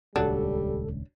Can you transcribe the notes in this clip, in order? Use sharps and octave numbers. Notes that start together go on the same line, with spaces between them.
D#1 C#2 F#3 G3 D4 A4